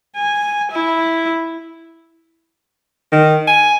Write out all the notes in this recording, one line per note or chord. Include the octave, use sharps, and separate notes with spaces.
G#5
E4
D#3
G#5